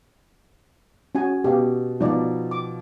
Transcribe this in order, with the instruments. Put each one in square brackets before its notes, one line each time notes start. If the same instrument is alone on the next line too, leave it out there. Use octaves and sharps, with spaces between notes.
[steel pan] C#4 F#4 G#5
[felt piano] B2 [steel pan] G4 F5
[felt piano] B2 F3 [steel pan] D#4 D5
[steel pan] D6